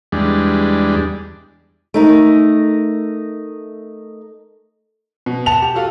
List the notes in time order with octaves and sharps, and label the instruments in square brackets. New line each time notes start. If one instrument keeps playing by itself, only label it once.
[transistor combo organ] E2 G3 G#3 D4
[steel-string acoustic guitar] A3 D#4 A#4
[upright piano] B2
[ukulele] F#5 A5 [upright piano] F7
[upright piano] G4
F4 F#4 A4